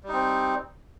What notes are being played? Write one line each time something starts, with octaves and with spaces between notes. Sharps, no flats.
G3 C4 D#4